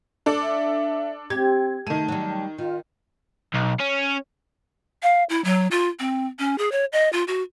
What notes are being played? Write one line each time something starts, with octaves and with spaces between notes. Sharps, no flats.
D4 A4 D6
E5
C4 G4 G#6
D#3 A3 A5 D#7
F#3 G3
D#3 F4
B1
C#4
F5
E4
F#3
F4
C4
C#4
G#4
C#5
D#5
F4
F#4